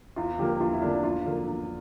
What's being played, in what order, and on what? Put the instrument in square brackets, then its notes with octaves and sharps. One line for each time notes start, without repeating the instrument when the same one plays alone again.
[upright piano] E2 [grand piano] F4
[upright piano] D3 F3 A#3 [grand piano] G4
[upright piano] E2 [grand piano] F4
[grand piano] E4
[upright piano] D3 F3 A#3 [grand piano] D4
[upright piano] E2 [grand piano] F4
[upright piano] D3 F3 A#3
E2